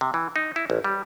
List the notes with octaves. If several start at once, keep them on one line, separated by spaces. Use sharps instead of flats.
C3
E3
D#4
E4
A1
G3